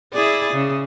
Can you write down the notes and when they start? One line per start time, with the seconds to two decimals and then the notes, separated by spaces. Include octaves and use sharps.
0.13 E4 G#4 D5
0.53 C#3